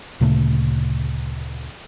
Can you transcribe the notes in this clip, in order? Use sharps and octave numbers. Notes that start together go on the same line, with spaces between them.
D2 A#2 C#3 A3